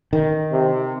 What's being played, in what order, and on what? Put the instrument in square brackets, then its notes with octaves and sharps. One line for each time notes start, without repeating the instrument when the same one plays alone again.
[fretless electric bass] D#3
[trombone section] C3